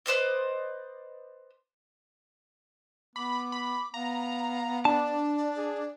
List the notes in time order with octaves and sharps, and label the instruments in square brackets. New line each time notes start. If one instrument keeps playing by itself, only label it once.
[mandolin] B4 C5 D5 D#5
[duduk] B3 [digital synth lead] B5 [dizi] D6
[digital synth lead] B5
[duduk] B3 [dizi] F5 [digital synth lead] A#5
[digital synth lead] D4 [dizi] D5 [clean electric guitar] A5
[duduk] G#4